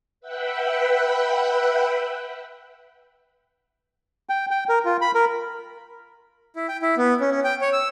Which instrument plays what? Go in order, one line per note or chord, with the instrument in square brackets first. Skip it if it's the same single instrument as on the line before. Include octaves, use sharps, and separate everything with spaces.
[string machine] B4 E5 F#5 G5 B5
[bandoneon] G5
G5
A#4
F4
B5
A#4
[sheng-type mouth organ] E4
G5
E4
B3
C#4
C#4
G5
C#5
E6